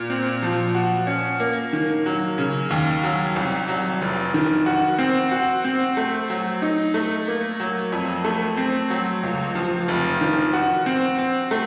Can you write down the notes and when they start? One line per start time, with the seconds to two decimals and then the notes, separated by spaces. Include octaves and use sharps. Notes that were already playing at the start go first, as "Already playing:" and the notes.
Already playing: A#2
0.10 C4
0.42 F3
0.75 F#4
1.07 C#4
1.40 A#3
1.73 D#3
2.06 F#3
2.38 C#3
2.71 D#2
3.03 F#3
3.36 C2
3.68 F#3
4.02 F1
4.34 D#3
4.66 F#4
4.99 C4
5.31 F#4
5.64 C4
5.97 A3
6.30 F#3
6.62 D#4
6.94 A3
7.28 A#3
7.60 F#3
7.92 F2
8.25 A3
8.57 C4
8.90 F#3
9.23 C#2
9.55 F3
9.88 F1
10.21 D#3
10.53 F#4
10.86 C4
11.19 C4
11.51 A3